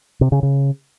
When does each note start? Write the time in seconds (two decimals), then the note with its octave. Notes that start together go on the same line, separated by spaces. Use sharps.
0.21 C3
0.32 C#3
0.43 C#3